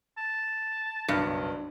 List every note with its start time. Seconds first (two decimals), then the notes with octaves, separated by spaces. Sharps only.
0.18 A5
1.08 F#1 B1 G2 D4